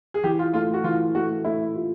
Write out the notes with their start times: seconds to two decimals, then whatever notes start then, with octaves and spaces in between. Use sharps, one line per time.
0.14 G#4
0.24 E3 G4
0.39 F4
0.54 A3 F4
0.74 F#4
0.84 E3 F4
1.15 A3 F#4
1.45 A3 E4
1.75 F4